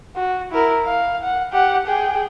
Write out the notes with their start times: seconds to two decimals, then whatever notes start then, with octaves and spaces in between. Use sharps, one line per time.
0.16 F#4
0.52 E4 A#4
0.85 F5
1.23 F#5
1.52 G4 F#5
1.87 G#4 G5